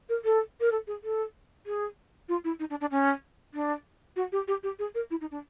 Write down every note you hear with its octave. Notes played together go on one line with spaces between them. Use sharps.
A#4
A4
A#4
A4
G#4
A4
G#4
F4
E4
D#4
D4
D4
C#4
D4
F#4
G4
G4
G4
G#4
A#4
E4
D#4
D4